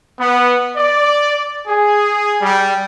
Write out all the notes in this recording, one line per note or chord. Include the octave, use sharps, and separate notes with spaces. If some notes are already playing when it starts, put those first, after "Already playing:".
B3
D5
G#4
G3